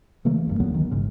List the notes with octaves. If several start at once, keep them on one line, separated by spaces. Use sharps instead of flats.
C#3 E3 A3 A#3
E1 G2 A#3
C#2 D3 F#3 B3
D#3 E3
A1 G#2 C#3